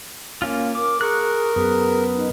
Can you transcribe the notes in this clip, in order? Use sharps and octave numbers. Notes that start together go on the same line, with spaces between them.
A#3 C#4 F4
A#4 D6
G#4 A#4 C#6 F#6
F#2 B3 G#4
D#4